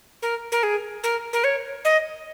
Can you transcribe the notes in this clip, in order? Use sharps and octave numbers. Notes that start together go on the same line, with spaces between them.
A#4
A#4
G#4
A#4
A#4
C#5
D#5